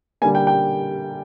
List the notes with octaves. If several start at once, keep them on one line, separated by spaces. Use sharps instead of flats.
D3 G3 A#3 G#5
G5
G5